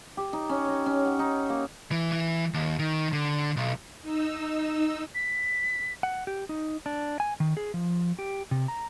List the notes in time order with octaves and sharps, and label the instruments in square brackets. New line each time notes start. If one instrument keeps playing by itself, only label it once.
[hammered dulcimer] G4
D#4
C#4
D#5
C#4
F#5
D#4
A#3
[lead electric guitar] E3
E3
D#2
D#3
D3
B1
[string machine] D#4 E6
[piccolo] B6
[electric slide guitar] F#5
G4
D#4
D4
G#5
D#3
G#4
F3
G4
C3
A#5